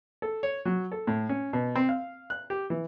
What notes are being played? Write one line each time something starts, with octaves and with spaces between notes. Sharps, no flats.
A4
C#5
F#3
A4
A2
C#4
B2
C4
F5
F#6
G4
E3